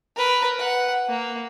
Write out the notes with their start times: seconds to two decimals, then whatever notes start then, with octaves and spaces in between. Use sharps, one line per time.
0.16 A#4 B4
0.58 F#5
1.09 A#3